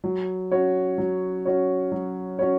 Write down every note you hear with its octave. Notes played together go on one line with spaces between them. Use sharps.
F#3
C#4 F#4 C#5
F#3
C#4 F#4 C#5
F#3
C#4 F#4 C#5